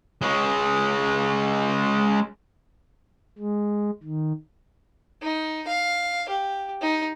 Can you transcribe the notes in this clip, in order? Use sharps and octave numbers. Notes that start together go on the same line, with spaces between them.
G#3 C#4
G#3
D#3
D#4
F5
G4
D#4